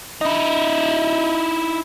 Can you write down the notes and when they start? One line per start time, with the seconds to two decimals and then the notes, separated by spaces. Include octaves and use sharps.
0.21 D#4 E4